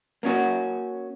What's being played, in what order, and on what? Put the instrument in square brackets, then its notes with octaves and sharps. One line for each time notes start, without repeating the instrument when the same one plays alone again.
[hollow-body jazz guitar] A#3 C#4 F#4